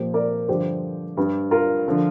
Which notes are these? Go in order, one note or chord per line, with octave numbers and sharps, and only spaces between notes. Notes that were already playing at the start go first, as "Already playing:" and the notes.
Already playing: A#2 F3 G4 C5
A#4 D5
G2 D3 F3 G4 C5
G2 G3
F4 A#4
D3 F3